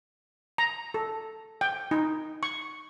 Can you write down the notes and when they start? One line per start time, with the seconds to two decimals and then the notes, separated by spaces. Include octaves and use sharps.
0.58 A#5
0.94 A4
1.61 G5
1.91 D#4
2.43 C#6